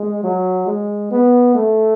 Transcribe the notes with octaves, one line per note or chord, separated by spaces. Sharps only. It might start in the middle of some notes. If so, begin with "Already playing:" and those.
Already playing: G#3
F#3
G#3
B3
A3